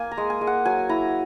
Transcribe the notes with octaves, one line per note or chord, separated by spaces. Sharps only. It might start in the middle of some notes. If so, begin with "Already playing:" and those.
Already playing: A#3 G#5
A#5
G#3
G#5
G#3
F#5
F#3 G#5
E4 A#5